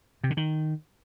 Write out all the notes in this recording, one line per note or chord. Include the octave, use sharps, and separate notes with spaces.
C3
D3
D#3